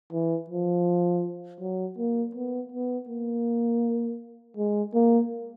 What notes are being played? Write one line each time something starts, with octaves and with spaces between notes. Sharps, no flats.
E3
F3
F#3
A#3
B3
B3
A#3
G#3
A#3